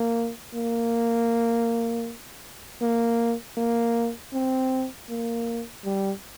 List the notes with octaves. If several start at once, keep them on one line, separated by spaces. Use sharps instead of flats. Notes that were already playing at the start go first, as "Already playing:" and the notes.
Already playing: A#3
A#3
A#3
A#3
C4
A#3
G3